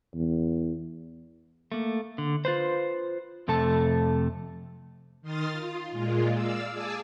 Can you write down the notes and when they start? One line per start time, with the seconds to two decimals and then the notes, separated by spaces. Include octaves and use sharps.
0.14 E2
1.72 A3 A#3
2.18 D3
2.45 F4 B4 C5
3.48 F2 C3 A3 A4 A5
5.22 D#3 C6 D#6 F6 A6
5.51 F4
5.91 A#2 G#3 F4
6.33 D5 F5 E6
6.71 G#4 G#5 A5 D6 E6